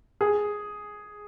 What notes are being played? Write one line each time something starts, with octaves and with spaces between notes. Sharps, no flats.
G#4